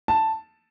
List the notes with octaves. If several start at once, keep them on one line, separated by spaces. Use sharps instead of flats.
A5